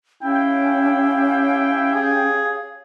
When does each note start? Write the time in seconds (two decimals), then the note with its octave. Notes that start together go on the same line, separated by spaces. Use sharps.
0.23 C#4 E4 G4 C#5 F5 G5
1.96 G#4